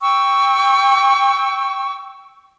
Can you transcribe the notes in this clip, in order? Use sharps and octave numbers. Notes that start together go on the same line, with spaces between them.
G5 C#6 E6